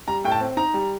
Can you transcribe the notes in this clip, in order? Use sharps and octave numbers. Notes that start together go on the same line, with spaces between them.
G3 A#5
A2 G5
A5
C4
D#4 A#5
G3